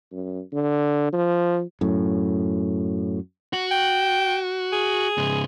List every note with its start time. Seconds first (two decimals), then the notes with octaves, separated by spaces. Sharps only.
0.13 F#2
0.53 D3
1.13 F3
1.81 F#2 A2
3.53 F#4
3.71 G5
4.72 G#4
5.18 G#2 C#3